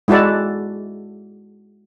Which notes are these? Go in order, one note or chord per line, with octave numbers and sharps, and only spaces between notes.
G#3 E4 F#4 A4 D5